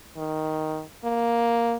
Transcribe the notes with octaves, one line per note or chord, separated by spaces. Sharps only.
D#3
A#3